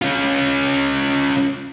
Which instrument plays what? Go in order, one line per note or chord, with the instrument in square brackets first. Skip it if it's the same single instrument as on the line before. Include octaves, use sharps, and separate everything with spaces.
[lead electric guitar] C#4 F4